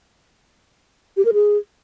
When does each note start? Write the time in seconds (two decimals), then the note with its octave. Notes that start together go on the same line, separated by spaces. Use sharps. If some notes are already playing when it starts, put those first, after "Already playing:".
1.17 G4
1.25 A#4
1.33 G#4